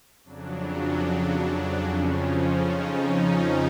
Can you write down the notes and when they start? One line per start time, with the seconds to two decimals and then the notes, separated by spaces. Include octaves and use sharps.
0.24 F2 C#3 F#3 D4
1.46 D4
1.86 F2 C#3 F3 C#4
2.27 C#4
2.67 D#4
3.07 C#4